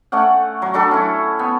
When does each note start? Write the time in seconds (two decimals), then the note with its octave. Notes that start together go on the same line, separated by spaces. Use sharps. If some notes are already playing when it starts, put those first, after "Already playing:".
0.12 A3 C#4 D5 F#5
0.62 F#3
0.74 F#3 D4 A4 A5
0.91 C#4 E4
1.39 B3